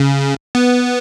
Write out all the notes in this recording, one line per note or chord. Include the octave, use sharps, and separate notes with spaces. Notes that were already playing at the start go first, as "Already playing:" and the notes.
Already playing: C#3
B3